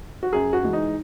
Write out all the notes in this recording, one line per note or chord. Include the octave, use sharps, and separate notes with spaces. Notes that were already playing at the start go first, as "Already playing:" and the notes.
F#4
F#2 G#4
F#4
E3 G#3
D#4